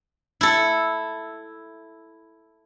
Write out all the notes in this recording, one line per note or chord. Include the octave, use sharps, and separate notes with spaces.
E4 A4